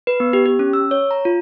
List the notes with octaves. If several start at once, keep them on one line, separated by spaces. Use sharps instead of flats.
B4
B3
G4
G4
C#4
E6
C#5
A#5
F4